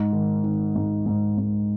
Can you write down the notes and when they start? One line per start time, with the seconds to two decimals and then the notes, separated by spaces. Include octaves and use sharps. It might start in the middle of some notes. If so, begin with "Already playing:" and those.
Already playing: G#2
0.13 D#3
0.44 D#3
0.75 G#2
1.06 G#2
1.38 G#2